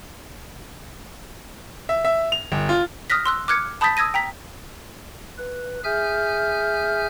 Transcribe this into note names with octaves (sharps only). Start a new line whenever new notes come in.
E5
E5
F7
G1
F4
D#6 F6 F#6 A#6 B6
C6 E6 F#6
D6 F6 F#6 G#6 C#7
A5 B5 D#6 G6 A6 B6
D#6 E6 G#6 A#6 D#7
G5 A#5 B6
B4
G#4 E5 G#5 F6 G6